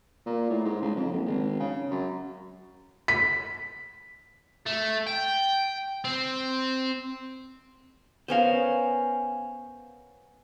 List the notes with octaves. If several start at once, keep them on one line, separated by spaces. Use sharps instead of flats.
A#2
A2
G#2
C#2
F2
F#1
G#1
C#3
F#2
B6
A3
G5
C4
B3 C#4 A#4 C5 F5